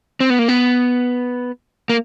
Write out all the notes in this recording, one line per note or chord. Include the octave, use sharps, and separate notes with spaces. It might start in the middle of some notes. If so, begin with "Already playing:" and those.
C4
B3
A#3
B3
A#3